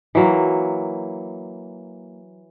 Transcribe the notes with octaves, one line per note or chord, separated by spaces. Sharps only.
E3 F#3 A#3